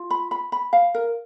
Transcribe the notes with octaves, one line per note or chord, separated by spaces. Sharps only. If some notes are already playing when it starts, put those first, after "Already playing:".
Already playing: F4
B5
B5
B5
F5
A#4